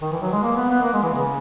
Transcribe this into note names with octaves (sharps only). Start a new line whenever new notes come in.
D#3
E3
F#3
G#3
A#3
B3
B3
A#3
G#3
E3
C#3